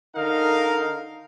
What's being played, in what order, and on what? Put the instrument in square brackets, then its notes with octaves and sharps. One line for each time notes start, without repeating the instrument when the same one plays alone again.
[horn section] D3 D#4 A#4 F5